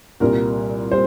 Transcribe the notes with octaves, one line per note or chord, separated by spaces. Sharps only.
C2 A#2 G3 A#4
G3 C5